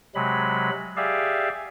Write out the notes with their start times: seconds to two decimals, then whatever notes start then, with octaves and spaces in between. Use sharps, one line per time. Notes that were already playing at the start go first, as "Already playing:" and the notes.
0.15 C3 F#3 G#3 B5
0.97 G4 G#4 D5 E5 F5